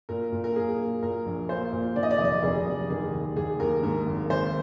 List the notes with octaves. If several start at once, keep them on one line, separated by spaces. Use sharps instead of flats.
A#2 A#4
A#2
A#4
A#3 G#4
A#3
A#2 A#4
A#1
A#3 C5
A#2
D#3 D5
D#5
D5
F1 D#5
D5
F1 G#4
F1
D#3 G#4
D#2
D#2 G#4
D#2 A#4
G#2 A#4
G#1
G#1 C5